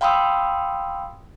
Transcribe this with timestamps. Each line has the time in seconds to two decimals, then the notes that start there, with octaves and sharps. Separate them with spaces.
0.01 F5 G5 B5 C6 D#6 E6